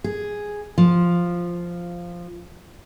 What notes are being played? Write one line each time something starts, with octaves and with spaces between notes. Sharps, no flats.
G#4
F3